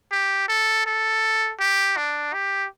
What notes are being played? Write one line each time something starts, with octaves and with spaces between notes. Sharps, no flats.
G4
A4
A4
G4
D4
G4